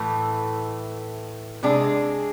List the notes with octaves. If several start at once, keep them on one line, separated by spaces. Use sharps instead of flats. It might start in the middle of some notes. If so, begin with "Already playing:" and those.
Already playing: A2 E3 A3
C3 G#3 D4 G#4